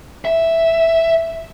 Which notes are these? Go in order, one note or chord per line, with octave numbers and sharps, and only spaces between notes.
E5